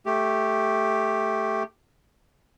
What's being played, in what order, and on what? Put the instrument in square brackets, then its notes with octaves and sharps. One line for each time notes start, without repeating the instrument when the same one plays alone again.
[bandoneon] A3 G4